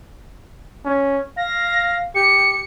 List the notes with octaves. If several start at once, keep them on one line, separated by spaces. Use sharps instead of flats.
C#4
F5 A#6
G4 C#7